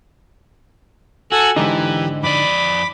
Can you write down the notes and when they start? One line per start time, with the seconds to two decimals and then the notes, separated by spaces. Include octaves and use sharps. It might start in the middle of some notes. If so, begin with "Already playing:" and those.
1.32 F#4 A4 G#5 E6
1.56 G#2 D3 E3 D#4 G4
2.23 F2 D5 B5 D6